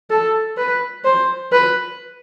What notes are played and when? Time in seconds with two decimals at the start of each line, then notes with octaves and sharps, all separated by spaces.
0.10 A4
0.58 B4
1.05 C5
1.52 B4